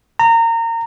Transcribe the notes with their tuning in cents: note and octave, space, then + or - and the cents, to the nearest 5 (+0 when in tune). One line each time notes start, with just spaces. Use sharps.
A#5 -25